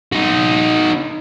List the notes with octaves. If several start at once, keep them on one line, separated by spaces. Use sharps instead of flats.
D#4 F#4